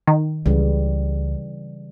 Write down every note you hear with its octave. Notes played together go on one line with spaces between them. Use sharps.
D#3
C#2 C#3 E3 G3